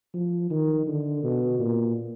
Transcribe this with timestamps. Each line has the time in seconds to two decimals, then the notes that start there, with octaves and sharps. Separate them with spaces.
0.14 F3
0.50 D#3
0.87 D3
1.23 B2
1.59 A#2